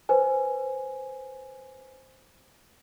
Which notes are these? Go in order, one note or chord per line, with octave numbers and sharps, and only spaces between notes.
B4 C5 G#5